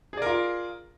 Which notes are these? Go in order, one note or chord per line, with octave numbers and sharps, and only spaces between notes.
F4 G#4 A#4 D5